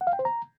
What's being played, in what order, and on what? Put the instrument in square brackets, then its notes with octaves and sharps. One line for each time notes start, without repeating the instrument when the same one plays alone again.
[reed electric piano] F#5
F5
G5
C5
A#5